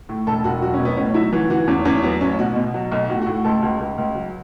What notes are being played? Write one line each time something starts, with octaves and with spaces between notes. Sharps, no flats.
A2
E1 A4
E1 F#4
F#3 F#4
C#4
B2
B3
A2 C#4
F#3 E4
E3 F#4
E3 F#4
E2 C#4
E2 C#4
F#3 B3
A1 C#4
B2 F#4
B2
F#3
B1
A2 F#4
F#4
A2
C#2 A4
C#2 F#4
C#2
C#2
F#3